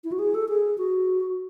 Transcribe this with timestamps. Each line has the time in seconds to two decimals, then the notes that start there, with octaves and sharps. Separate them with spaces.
0.04 E4
0.12 F#4
0.19 G#4
0.34 A4
0.49 G#4
0.78 F#4